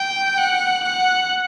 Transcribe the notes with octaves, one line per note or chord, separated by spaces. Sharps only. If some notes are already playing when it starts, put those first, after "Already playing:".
Already playing: G5
F#5
F#5